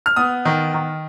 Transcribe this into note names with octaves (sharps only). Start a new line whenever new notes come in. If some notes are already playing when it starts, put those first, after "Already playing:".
F6
B3 D#6
D#3
D#3